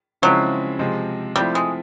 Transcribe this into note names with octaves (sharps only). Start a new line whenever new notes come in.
C#3 F3 F#3 G#3 C4 E4
C3 F3 G#3 C4
F3 G3 A3 C4 E4
G#3